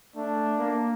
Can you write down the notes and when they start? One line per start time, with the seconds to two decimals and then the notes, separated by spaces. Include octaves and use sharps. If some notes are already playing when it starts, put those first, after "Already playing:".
0.16 A3 D4
0.59 A#3